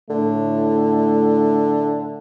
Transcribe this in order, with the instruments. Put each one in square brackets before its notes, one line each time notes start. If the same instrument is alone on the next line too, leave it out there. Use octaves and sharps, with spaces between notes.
[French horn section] A2 A3 [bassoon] D3